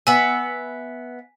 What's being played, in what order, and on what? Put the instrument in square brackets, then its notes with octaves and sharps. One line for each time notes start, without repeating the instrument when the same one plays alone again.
[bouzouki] B3 E5 [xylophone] G#5